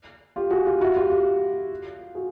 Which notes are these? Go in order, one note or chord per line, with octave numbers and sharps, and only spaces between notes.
F4 G4
F#4 G#4
F4 G4
E4 F#4
F4 G4
F4 G4
F#4 G#4